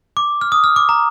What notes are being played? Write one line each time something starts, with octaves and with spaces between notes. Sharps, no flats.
D6
F6
D#6
F6
D6
A#5